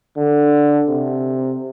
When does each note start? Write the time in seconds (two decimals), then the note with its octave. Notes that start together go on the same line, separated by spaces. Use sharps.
0.17 D3
0.88 C3